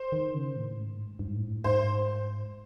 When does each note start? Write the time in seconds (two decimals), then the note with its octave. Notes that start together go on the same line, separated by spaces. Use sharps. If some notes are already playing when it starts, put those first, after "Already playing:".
Already playing: C5
0.12 D#3
0.34 C#3
0.56 A2
0.78 G#2
1.19 G2
1.28 G#2
1.36 A2
1.64 G#2 C5